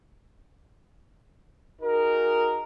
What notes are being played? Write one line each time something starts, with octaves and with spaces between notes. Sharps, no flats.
D#4 F#4 G#4 A#4